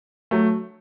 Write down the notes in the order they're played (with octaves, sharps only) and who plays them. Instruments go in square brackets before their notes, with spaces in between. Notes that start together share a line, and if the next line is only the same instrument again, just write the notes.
[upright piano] F#3 A3